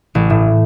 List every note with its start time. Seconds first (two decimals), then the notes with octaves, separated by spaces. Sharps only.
0.15 A1
0.30 A2